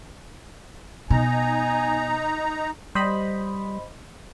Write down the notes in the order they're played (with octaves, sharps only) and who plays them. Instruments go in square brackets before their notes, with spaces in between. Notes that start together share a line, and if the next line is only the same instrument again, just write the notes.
[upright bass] B2 [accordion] D#4 A#5 [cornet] G#5
[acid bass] G3 [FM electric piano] C5 D#5 B5